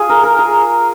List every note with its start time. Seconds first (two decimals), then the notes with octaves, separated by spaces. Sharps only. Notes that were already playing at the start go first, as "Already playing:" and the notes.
Already playing: F4 G#4
0.09 A#4
0.23 A#4
0.39 G#4